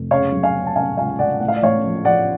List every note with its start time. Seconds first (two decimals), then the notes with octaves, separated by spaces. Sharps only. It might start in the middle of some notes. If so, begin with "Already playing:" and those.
Already playing: F1
0.11 C#3 C#5 F5
0.32 F#3
0.43 F5 G#5
0.55 C#3
0.67 A5
0.76 C#3 F5 G#5
0.98 C#2 F5 G#5
1.19 C#2 D5 F#5
1.40 A2 F#5
1.48 F5
1.56 D5
1.62 A1 C#5 F5
1.84 F3
2.05 F3 D5 F#5